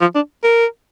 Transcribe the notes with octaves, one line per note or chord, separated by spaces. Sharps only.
F3
D4
A#4